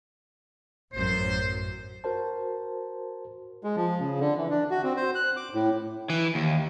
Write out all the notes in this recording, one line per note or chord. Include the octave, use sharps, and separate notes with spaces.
A1 F#2 C5
F#4 A#4 C5 A5
G#3
F3
C#3
D3
E3
D4
F#4
C4
C5
F#6
D6
A2
E3
D#2